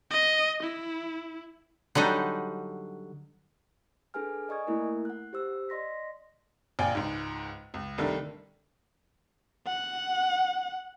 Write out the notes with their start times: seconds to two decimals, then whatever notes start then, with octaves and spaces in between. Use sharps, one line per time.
0.11 D#5
0.64 E4
1.95 D3 F#3 G3 D#4
4.14 D4 G#4 A4 B4 G#5 F6
4.49 D5 D#5 G#5 C#6 D#6 G#6
4.67 A3 A#3 E4 A#4
5.05 F#5 F#6
5.33 G4 C5 E6
5.69 D5 D#5 C6 A#6 B6
6.79 A#1 D5 F5 G5 G#5
6.95 C#2 G#2
7.74 C#2
7.98 C2 D3 D#3 G3 A3
9.67 F#5